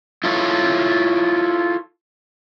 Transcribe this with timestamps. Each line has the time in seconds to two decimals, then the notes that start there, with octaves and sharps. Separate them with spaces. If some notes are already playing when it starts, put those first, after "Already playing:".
0.24 E4 F4 A4 C#5